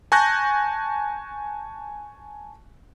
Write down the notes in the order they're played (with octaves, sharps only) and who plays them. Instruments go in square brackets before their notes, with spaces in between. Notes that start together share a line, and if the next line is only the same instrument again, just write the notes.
[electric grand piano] G#5 A5 C#6 F#6 G6 A#6